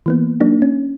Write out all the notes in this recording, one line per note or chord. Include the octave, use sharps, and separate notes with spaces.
E3 A#3 B3
F#3 A#3 D4 D#4
C#4